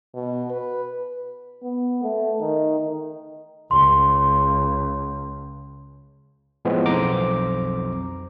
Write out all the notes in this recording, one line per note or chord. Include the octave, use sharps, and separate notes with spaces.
B2
B4
B3
A3
D#3
C#2 C6
A2 E3 F3 G#3 B3 C4
B1 F2 C5 A#5 D6